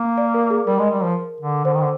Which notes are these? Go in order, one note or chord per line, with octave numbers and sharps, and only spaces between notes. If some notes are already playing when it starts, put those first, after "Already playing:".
Already playing: A#3
D5
A#4
G#4
G3 A#4
G#3
G3
F3
D3
D3 C5
D#3
D3